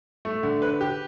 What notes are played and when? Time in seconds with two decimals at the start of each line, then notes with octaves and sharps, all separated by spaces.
0.25 A3
0.43 D3
0.62 B4
0.81 G4